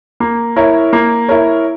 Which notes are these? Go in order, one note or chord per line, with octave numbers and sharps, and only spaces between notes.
A#3
E4 A#4 C#5
A#3
E4 A#4 C#5